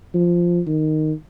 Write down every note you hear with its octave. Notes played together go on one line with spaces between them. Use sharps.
F3
D#3